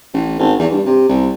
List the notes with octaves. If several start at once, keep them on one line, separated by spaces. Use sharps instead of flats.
A1
G#1
E2
G2
C3
C2